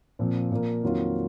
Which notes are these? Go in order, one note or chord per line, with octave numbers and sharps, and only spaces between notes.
A#2 F3 C4
A#2 F3 A#3
F2 D#3 F#3 A#3 F4